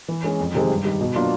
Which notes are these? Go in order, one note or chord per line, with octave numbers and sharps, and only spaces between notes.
E3
G#3 C#4
F2
C3 D#3 G#3 C4
G2
D#3 G3
B2
F#3 A#3 D4 F4